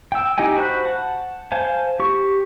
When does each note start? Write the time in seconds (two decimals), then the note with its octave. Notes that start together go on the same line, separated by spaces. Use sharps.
0.12 G5 E6
0.38 D#4 G4 D#5 G5 G#5
0.57 F#4 C5 B5 F#6
0.85 F#5 A5
1.52 C5 F5 G#5 A5
2.00 G4 C#6